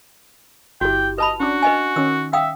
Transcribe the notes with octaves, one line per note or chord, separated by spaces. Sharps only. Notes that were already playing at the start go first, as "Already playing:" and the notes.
G1 E4 F#4 G4 G5
B4 D#5 A5 B5
C#4 D4 F#4
B4 D#5 G#5
D#3 C#4 E6
E5 F5 G5 D#6